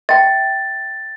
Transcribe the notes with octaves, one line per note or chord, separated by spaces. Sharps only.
E5 G5 A6